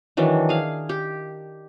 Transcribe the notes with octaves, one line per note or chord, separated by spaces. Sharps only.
D#3 E3 F#3 D4
G#4 F5
G4